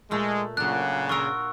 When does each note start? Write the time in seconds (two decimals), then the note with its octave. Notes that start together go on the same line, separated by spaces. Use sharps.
0.11 A#2 G#3 A3
0.57 A#2 C#3 F#3 D4 F#6
1.09 F4 F#4 A#4 C#6 E6